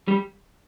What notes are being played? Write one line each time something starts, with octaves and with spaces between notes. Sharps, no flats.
G3